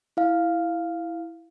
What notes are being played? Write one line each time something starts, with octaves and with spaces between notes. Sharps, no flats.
E4 F5